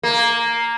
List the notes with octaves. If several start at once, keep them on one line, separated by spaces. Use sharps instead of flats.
A#3